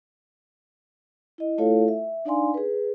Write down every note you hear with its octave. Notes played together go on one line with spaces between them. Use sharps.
E4 D#5
A3 E4 F4 A4 C#5 F5
E5
D4 D#4 D5 F5 G#5 C6
G#4 B4